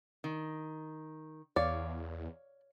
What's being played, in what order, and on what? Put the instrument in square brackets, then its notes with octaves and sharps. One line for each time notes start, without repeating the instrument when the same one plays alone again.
[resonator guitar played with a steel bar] D#3
[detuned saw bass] E2 [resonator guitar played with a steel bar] C#5 F5 [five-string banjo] D5